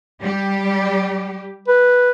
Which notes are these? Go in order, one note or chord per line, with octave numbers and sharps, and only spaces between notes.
G3 G4
B4